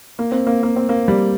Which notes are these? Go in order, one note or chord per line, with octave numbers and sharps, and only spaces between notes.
A#3
C4
A#3
A#3
C4
A#3
G3